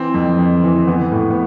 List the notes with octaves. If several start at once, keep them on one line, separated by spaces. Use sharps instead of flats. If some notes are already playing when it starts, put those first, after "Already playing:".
Already playing: E3 C4
F2
F2
E3
E3 B3
A2
B3